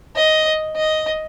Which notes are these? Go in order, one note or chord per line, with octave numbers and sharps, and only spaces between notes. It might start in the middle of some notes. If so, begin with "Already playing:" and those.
D#5
D#5